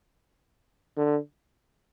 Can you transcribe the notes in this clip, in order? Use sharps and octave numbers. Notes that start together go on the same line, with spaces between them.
D3